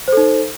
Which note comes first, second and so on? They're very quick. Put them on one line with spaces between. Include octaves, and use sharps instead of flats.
C5 A4 D#4